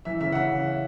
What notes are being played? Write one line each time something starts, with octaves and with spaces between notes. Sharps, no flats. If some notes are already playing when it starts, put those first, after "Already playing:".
E3 E5
C#3 E5
F#5
C#3 E5